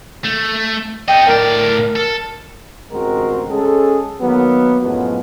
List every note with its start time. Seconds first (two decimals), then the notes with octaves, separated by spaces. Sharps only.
0.24 A3
1.08 A4 D#5 G5
1.28 A2 A#4 D5
1.96 A4
2.91 A1 D2 G#3 C4 F#4 A#4
3.49 G#3 C#4 G#4 A4
4.21 D#3 F#3 A#3 B3
4.81 F#2 A2 F3 F#3 G#3 B3